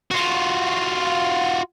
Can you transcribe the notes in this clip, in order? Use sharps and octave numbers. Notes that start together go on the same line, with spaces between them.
F4 F#4